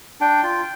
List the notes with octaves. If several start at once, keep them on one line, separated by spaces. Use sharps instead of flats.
D4 G5
F4